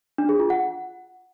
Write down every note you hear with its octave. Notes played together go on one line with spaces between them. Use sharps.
D4
G#4
F4
F#5